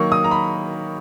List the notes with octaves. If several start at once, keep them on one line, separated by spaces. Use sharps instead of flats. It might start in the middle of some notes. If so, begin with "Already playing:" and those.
Already playing: D#3 F#3 A#3 C#6
D#6
A#5
B5